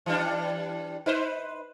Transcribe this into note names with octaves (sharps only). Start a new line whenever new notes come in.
E3 G3 D4
D#4 B4 C5